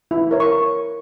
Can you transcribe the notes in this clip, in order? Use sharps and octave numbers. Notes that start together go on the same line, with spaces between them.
E4
A#4 C#5
C#6